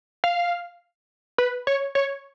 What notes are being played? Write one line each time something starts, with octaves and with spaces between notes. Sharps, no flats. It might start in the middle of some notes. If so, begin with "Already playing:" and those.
F5
B4
C#5
C#5